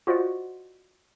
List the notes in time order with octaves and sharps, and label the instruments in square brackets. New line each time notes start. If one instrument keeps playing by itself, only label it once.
[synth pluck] F4 F#4 C5 D5 D#5 F#5